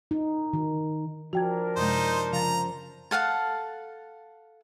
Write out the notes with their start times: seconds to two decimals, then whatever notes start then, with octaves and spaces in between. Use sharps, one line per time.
0.11 D#4
0.53 D#3
1.33 F3 D4 F#4 A#4 G5 G#6
1.76 F#2 C3 G#3 D#4 C5
2.33 C#3 F3 F5 A#5 A6
3.11 A4 F5 F#5 A5